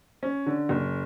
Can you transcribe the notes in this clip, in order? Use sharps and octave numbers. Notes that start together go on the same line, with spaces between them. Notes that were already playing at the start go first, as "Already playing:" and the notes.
C#4
D3
F#1